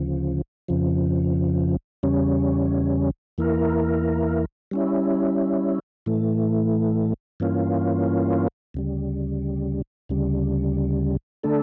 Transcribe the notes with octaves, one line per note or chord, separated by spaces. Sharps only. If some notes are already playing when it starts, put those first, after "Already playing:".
Already playing: D2 C#3 F3
F2 C#3 F3
E2 C#3 G3 C#4
E2 E3 A#3 E4 A#4
G3 C#4 E4
A2 E3 A3
G2 E3 A#3 C#4 F4
D2 C#3 G3
D2 C#3 G3
D3 A3 D4 A4